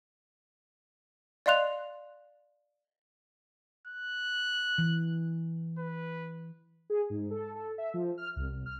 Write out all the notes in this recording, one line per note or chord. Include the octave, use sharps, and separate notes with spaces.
D5 D#5 F5 C6 F#6 F7
F#6
E3
B4
G#4
G#2
A4
A4
E5
F3
F6
C2
F6